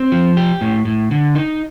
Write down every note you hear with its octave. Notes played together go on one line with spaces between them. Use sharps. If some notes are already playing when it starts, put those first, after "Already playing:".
Already playing: C4
F3
G4
A2
A2
D3
D#4